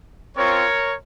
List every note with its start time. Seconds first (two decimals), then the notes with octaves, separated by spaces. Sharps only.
0.37 C4 F4 A#4 C#5